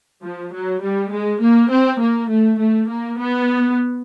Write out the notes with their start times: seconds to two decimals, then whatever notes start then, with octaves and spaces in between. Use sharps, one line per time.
0.23 F3
0.53 F#3
0.83 G3
1.12 G#3
1.42 A#3
1.71 C4
2.01 A#3
2.31 A3
2.60 A3
2.90 A#3
3.20 B3